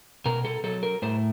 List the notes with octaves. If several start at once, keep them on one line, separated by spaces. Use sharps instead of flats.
B2 A#4
A4
F#3 A4
A#4
A2 C5